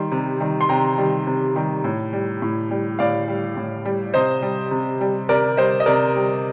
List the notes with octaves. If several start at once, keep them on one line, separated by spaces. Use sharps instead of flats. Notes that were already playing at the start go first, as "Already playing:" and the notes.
Already playing: D#3 G3 C6
C3
D#3 G3
C6
C3 G5 A#5
D#3 G3
C3
D#3 G3
A2
G3
A2
G3
A2 D5 F5
G3
A2
G3
C3 C5 D#5
G3
C3
G3
C3 A#4 D5
G3 C5 D#5
D#5
C3 A#4 D5
G3